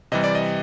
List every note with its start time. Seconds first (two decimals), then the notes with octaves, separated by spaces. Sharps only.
0.12 C3 E3 G3 D#5
0.24 D5
0.35 D#5